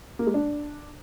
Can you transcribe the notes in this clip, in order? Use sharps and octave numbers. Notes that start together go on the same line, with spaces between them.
A#3
G#3
D4